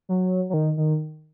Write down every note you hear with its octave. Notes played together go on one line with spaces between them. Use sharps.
F#3
F#3
D#3
D#3